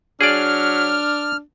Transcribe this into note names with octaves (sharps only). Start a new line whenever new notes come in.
F#3 D4 G#4 D5 F6